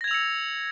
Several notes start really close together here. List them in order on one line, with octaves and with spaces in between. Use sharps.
A#6 G#6 F7 E6 C#7